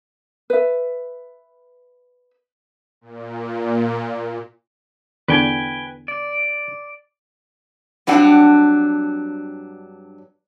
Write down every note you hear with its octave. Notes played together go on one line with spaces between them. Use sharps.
B4 E5
A#2
E2 D3 B4 G5 G#5
D5
G2 F#3 C4 D4 F#5